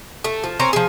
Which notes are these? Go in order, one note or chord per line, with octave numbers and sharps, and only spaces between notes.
A3
F3
C4 C#4 A#4 A#5
F3 G#4